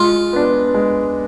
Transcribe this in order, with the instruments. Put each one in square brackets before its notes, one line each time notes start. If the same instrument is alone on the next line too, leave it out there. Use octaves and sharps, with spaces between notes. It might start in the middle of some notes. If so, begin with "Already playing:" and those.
Already playing: [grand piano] G#3 [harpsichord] F4
[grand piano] B3 D4
G#3